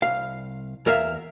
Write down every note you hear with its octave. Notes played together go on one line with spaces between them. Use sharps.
C2 F5
E2 A#4 E5 F5